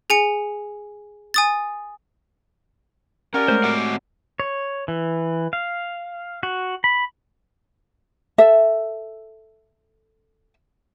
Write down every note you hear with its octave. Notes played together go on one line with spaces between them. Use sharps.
G#4 G#5 C#7
G#5 D#6 A6
C#4 G4 A#4 D5 F#5
G#3 A3 C5 C#5
C4 F#4 F#5 D6
C#5
E3
F5
F#4
B5
A4 E5